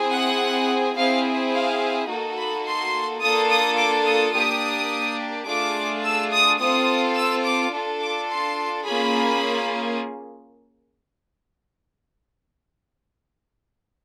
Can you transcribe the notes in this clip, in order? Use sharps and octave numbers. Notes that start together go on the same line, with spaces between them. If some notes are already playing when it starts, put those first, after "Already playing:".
Already playing: C4 E4 G#4
F#5
C4 E4 G#4 F5
F5
A#3 D#4 F#4 A4
B5
C6
A#3 D4 F4 A4 D#6
D#6
D6
D#6
A#3 D4 G4 D#6
A3 D4 F4 G#4 D6
E6
D#6
C4 F4 A4 D#6
E6
D6
D4 F4 A4
D6
C6
A#3 C#4 F4 G#4 B5